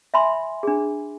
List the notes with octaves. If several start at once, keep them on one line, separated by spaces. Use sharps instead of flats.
E5 G#5 B5 C6
D4 G#4